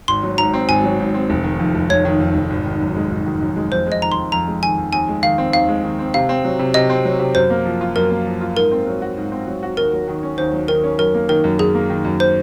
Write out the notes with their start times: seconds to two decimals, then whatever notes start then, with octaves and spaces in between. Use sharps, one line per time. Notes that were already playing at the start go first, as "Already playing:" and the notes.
0.08 G#1 C6
0.23 F#3
0.38 G#2 A#5
0.54 C4
0.69 G#1 G#5
0.84 F#3
0.99 G#2
1.14 C4
1.30 F1
1.44 D#3
1.60 F2
1.75 F1
1.90 F1 C#5
2.05 D#3
2.20 F2
2.35 F1
2.50 G#1
2.66 D#3
2.81 F#2
2.96 G#3
3.11 G#1
3.26 D#3
3.41 F#2
3.56 G#3
3.72 F2 C5
3.86 G#3
3.92 D#5
4.02 D#3 A#5
4.12 C6
4.17 F2
4.32 F2 A#5
4.47 G#3
4.63 D#3 G#5
4.78 F2
4.93 D#2 G#5
5.08 G#3
5.23 D#3 F5
5.38 C4
5.53 D#2 F5
5.69 G#3
5.84 D#3
5.99 C4
6.14 C3 F5
6.29 C4
6.44 F#3
6.59 C3
6.74 C3 D#5
6.90 C4
7.05 F#3
7.20 C3
7.35 F#2 C5
7.50 A#3
7.65 F3
7.81 F4
7.96 F#2 A#4
8.11 A#3
8.26 F3
8.41 F4
8.56 G#2 A#4
8.72 C4
8.87 F#3
9.02 F#4
9.17 G#2
9.32 C4
9.47 F#3
9.63 F#4
9.77 D#2 A#4
9.93 F#3
10.08 D#3
10.23 C#4
10.38 D#2 C5
10.53 F#3
10.68 D#3 A#4
10.84 C#4
10.99 F#2 A#4
11.14 A#3
11.29 D#3 A#4
11.44 F#2
11.59 F#2 G#4
11.74 A#3
11.90 D#3
12.05 F#2
12.20 C5